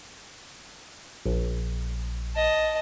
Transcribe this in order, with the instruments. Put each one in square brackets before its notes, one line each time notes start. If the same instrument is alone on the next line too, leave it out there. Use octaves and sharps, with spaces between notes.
[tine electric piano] A#1
[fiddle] D#5 A5